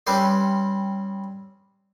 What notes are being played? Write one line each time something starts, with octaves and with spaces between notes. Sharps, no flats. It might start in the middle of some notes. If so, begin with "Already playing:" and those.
G3 C4 C#4 B4 C5 D5